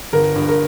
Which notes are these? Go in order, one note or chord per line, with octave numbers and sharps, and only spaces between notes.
G1 A#4
G2
A#4